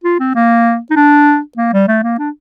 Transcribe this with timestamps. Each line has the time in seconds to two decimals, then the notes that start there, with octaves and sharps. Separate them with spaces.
0.04 F4
0.20 C4
0.35 A#3
0.90 D#4
0.96 D4
1.57 A#3
1.73 G3
1.88 A3
2.03 A#3
2.19 D4